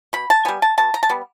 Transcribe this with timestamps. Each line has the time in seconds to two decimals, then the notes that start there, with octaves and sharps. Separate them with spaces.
0.13 B2 B5
0.30 A5
0.45 G3 B3 G#5
0.62 A5
0.78 B2 A5
0.94 A#5
1.03 A5
1.09 G3 B3